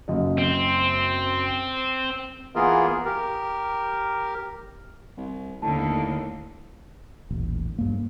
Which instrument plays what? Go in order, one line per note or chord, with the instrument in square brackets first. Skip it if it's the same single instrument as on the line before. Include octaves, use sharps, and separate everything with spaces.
[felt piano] F#1 F#2 D#5
[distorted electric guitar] C4
[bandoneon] E3 A#3 B3 F4 G#4 A#4
G4 A#4
[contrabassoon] C2
[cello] D#2 D3 [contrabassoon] A2 [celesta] A5
[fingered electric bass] D#1 A1
G2 A#3